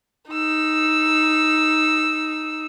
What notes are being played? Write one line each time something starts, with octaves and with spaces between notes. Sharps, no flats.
D#4 E6